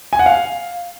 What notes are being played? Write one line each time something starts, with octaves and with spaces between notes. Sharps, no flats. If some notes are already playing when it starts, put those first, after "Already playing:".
G#5
F#5
F5